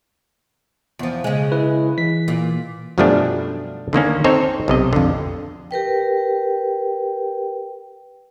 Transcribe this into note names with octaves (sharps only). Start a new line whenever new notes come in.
E2 F3
C#3 G#3
E4 B4
E3 B6
A#2
F#2 B2 F3 G3 A3 D4
D3 D#3 A#3 C#4
C4 D#4 A4 C5 C#5
B1 C3 D#5
F2 D3
G4 A#4 B4 G5